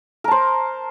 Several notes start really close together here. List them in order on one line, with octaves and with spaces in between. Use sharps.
A#4 A5 C5